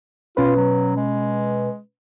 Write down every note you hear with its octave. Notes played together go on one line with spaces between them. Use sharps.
B2 C#4 F4 B4
F#3
G#3